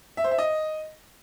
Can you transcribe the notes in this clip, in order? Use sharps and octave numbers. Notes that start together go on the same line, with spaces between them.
E5
C5
E5
D#5